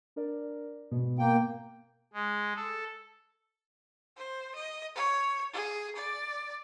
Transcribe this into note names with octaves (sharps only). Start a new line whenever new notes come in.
D4 A#4 D5
G#2 B2 B3
A#3 G5
G#3
A4
C5
D#5
C#5
G#4
D5